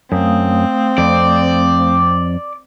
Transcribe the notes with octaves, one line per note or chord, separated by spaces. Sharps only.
F#2 A3 C4 F5 D#6
F2 D5